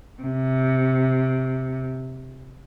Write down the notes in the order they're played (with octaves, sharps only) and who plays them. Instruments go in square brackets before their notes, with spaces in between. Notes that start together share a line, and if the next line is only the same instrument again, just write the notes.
[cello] C3